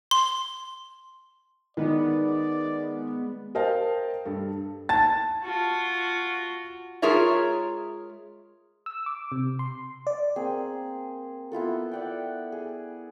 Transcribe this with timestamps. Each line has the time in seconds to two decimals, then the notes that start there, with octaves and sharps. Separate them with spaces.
0.11 C6
1.77 D#3 G#3 B3 D5
3.55 A#4 C5 D#5 F5 G5 A5
4.25 G2 A4
4.89 A5 A6
5.43 F4 F#4
7.02 G#3 F4 G#4 A#4 C#5 E5
8.86 E6
9.06 D6
9.32 C3
9.59 C6
10.07 D5
10.36 A#3 C4 G#4
11.52 B3 E4 F4 A4
11.92 D5 F#5 G5
12.52 G#4